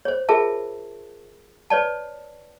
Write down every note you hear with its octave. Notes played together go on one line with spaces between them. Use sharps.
C5 C#5
F4 G#4 A#4 E5 A5
B4 C#5 D5 A5